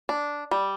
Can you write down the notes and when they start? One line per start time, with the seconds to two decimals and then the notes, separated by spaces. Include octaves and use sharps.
0.09 D4
0.51 G3